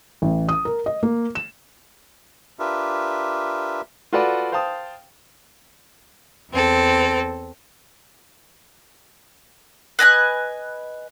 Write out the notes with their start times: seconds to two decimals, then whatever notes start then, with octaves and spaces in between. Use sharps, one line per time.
0.22 A1
0.49 D#6
0.65 A#4
0.86 D#5
1.03 A#3
1.35 E7
2.59 D4 F4 G4 A#4 B4 E5
4.13 F4 F#4 A4 B4 D5 F#5
4.52 C5 F5 G5 A5 D#6
6.51 E2 C4 A4
9.99 B4 D#5 G#5 F#6